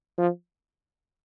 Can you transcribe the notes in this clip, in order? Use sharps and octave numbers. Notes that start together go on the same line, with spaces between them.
F3